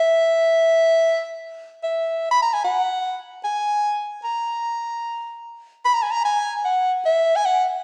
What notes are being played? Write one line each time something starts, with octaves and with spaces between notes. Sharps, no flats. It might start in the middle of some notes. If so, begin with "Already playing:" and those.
Already playing: E5
E5
B5
A#5
G#5
F#5
G#5
A#5
B5
A#5
G#5
A#5
G#5
F#5
E5
G#5
F#5